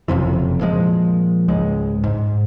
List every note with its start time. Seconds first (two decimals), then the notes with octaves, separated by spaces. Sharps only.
0.08 F#1 F2 C3 E3
0.61 A#2 F3 G#3
1.48 C#2 G#2 G#3
2.04 G#2